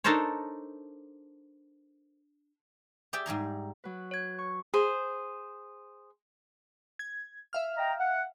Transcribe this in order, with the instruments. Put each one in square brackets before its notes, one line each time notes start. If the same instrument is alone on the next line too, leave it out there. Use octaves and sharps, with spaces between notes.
[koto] D4 D#4 A4 A#4 C5 C#5
[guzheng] G4 G#4 D5 E5 G5
G#2 G3 G#4 A#5
[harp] F#3 B4
[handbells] C#5 G#6
[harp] C#6
[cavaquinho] G#4 C5
[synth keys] G#6
E5 F5 F6
[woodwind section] D#5 G5 A#5
F#5